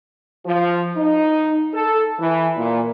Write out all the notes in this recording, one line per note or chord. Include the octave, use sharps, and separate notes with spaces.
F3
D#4
A4
E3
A#2